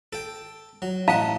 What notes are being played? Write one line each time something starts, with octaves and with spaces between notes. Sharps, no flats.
A4 G5
F#3
A1 D#5 F5 F#5 A5 A#5